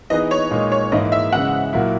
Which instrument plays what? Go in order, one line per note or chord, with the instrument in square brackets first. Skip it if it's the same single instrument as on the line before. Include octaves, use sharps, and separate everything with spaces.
[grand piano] E3 B3 D#4 G#4 B4 [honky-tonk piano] D#5
[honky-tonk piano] C#5
[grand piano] A#2 G#3 D#4
[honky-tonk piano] C#5
[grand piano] G#2 E3 A#3 E4 [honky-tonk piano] D#5
[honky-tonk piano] E5
[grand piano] C#3 E3 G#3 [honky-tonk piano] F#5
[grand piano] A#2 F#3 A#3 E4